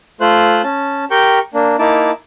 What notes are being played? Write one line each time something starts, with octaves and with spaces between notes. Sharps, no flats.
A3 F4 C5 F#6
C#4 A5
G4 A#4 G5 C#6 G6
A#3 D4
A#3 D#4 E4 A5 D6